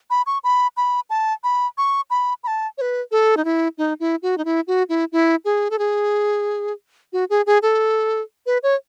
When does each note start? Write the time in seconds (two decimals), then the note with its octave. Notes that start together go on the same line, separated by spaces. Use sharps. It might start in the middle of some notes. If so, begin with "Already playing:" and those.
0.10 B5
0.27 C#6
0.44 B5
0.77 B5
1.10 A5
1.44 B5
1.78 C#6
2.10 B5
2.44 B5
2.47 A5
2.78 C#5
2.81 B4
3.11 A4
3.37 D#4
3.45 E4
3.78 D#4
4.00 E4
4.23 F#4
4.38 D#4
4.45 E4
4.67 F#4
4.89 E4
5.12 E4
5.45 G#4
5.70 A4
5.79 G#4
7.13 F#4
7.30 G#4
7.47 G#4
7.62 A4
8.46 B4
8.63 C#5